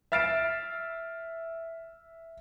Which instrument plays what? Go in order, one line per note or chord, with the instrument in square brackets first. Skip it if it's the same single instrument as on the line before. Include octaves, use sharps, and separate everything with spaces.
[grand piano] E5 F6 A6 C7 D7 E7